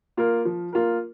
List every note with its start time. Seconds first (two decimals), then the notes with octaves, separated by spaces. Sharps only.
0.17 A#3 F4 A#4
0.45 F3
0.73 A#3 F4 A#4